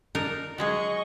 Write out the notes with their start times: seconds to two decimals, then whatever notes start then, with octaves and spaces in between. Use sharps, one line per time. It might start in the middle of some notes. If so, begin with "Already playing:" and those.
0.15 D4 D#4 A#4
0.58 F#3 G#3 G#4 D#5 C#6